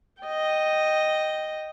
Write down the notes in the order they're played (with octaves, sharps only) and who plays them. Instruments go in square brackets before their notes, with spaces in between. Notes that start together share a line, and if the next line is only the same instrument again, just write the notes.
[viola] D#5 G5